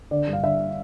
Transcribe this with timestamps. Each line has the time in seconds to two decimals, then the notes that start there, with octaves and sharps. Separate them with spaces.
0.11 D3 D5
0.28 G2
0.33 F5
0.43 D3 E5